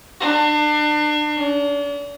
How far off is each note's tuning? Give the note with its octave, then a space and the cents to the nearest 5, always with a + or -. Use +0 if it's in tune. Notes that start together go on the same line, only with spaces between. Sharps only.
D4 +35
D4 -40